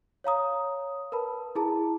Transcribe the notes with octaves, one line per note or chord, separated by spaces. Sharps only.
C#5 F5 A#5 D#6
A#4 B4 A5 B5
E4 G#4 A5 A#5